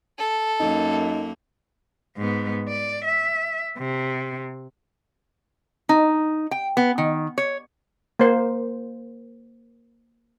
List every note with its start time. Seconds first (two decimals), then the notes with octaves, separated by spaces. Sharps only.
0.18 A4
0.60 F#2 A#3 D#4
2.17 G#2 B3
2.68 D5
3.05 E5
3.78 C3
5.89 D#4
6.51 G5
6.77 B3
6.98 D#3
7.38 C#5
8.19 A#3 C5